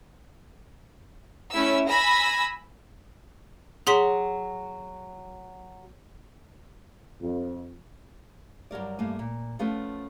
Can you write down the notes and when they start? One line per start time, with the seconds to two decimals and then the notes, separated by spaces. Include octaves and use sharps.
1.52 A3 C#4 E4 E6
1.89 G#5 B5 E6 A#6
3.87 F#3 G#4 C6 B6
7.21 F2
8.71 G2 F#3 A#4 D5
8.99 G2 A3 A#3 G#5
9.19 A#2
9.59 F3 A3 B3 C#4 B4